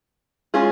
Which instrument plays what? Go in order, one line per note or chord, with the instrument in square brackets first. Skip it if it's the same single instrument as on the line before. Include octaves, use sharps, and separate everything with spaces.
[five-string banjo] G#3 C#4 F4 G#4